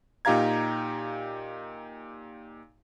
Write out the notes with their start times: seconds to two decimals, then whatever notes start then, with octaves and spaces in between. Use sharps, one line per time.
0.25 A#2 D#4 G4 F5 A#5 G#6